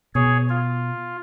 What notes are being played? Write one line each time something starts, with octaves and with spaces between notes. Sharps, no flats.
B2 G#4 C#5
F4